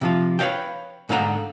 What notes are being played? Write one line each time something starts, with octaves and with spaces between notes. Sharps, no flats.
C3 F3 F4
B4 C#5 D#5 F5 G5
G#2 D3 F5 F#5 A#5